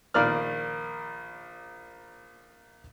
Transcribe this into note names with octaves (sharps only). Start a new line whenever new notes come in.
A#1 D#3 A#3 D5 F6